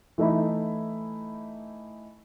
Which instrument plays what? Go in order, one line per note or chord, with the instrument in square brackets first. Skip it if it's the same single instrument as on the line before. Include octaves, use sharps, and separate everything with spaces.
[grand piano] E3 A3 D#4 E4